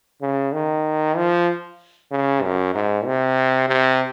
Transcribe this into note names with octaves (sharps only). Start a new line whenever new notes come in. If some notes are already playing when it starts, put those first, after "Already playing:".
C#3
D#3
F3
C#3
F#2
G#2
C3
C3